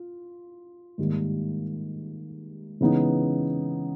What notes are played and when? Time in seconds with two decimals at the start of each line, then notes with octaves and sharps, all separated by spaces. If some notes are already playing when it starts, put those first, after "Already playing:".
Already playing: F4
0.98 G#2 D#3 G3 A#3
2.81 C#3 E3 G#3 B3 D#4